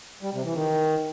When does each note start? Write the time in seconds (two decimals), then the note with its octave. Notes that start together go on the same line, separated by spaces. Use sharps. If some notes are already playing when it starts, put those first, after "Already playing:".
0.23 G3
0.33 C3
0.44 E3
0.54 D#3